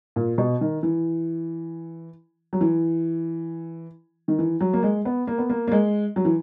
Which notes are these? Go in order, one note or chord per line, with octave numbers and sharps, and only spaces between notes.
A#2
B2
D#3
E3
F#3
E3
D#3
E3
F#3
A#3
G#3
B3
A#3
B3
A#3
A#3
G#3
F#3
E3